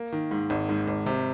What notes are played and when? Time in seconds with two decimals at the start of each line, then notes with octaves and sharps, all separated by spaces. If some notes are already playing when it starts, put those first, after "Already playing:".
Already playing: A#3
0.12 D#3
0.31 G#2
0.50 G#1
0.69 G#2
0.88 G#1
1.06 C3